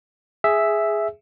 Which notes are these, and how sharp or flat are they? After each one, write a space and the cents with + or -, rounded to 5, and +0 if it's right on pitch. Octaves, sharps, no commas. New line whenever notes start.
G#4 +0 E5 +0